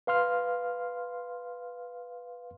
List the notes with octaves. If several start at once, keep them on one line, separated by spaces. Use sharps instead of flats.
B4 F5 C6 F6